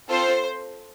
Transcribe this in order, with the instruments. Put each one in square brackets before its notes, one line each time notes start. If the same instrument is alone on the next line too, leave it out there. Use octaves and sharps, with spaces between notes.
[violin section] C4 F4 A4 C5